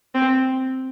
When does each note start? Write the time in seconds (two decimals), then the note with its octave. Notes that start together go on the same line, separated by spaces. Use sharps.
0.15 C4